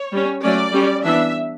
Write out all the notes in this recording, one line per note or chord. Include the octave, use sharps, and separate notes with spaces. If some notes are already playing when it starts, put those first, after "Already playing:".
Already playing: C#5
G3 C#4
F#3 A3 C#4 D5
G3 C#4
E3 B3 D4 E5